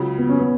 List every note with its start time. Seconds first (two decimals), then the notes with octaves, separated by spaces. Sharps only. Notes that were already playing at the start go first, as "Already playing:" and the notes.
Already playing: C#2 C#3 F#3
0.18 B3
0.29 C#4
0.39 B3